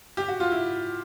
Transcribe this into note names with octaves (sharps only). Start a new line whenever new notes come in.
G4
F#4
F4
E4